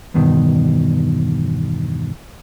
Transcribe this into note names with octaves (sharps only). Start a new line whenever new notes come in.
E2 G2 B2 D#3